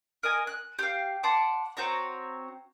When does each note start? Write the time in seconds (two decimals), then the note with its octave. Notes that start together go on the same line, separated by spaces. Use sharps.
0.23 A#4 D#5 G#5
0.47 F#6
0.79 G4 F5
1.23 F#5 A5 C6 D6
1.77 C4 F#4 C#5 A#5